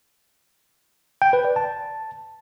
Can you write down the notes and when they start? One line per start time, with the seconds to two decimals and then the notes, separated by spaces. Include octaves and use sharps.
1.22 G5
1.33 B4
1.45 D5
1.56 A5